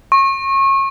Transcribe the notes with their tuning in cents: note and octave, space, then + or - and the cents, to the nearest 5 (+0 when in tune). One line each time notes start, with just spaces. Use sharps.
C#6 -30